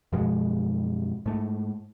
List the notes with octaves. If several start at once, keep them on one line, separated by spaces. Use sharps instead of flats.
F#2 B2 F3 G#3
G#2 A3